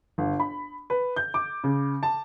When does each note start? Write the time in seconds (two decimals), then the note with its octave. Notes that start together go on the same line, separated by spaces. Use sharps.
0.18 G1
0.40 B5
0.90 B4
1.16 G6
1.34 D6
1.64 C#3
2.03 A5